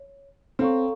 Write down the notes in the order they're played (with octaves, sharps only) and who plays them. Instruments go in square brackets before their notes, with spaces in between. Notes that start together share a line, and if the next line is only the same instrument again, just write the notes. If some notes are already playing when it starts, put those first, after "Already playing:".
Already playing: [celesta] C#5
[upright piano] C4 [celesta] A4 C#5 F5 A#5 C#6